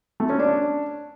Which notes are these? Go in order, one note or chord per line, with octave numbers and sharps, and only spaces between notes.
A3
C#4
D4